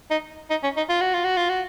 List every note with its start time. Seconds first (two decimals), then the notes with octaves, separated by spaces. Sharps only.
0.11 D#4
0.50 D#4
0.64 C#4
0.77 D#4
0.90 F4
1.01 F#4
1.14 F4
1.25 F#4
1.37 F4
1.49 F#4